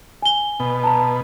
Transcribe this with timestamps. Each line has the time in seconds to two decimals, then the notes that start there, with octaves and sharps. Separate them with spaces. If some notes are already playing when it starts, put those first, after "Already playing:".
0.22 G#5 G7
0.60 B2
0.84 A5 A#5